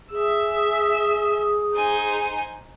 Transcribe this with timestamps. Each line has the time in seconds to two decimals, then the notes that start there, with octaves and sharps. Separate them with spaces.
0.11 G#4 E5 E6
1.73 D#4 C5 G#5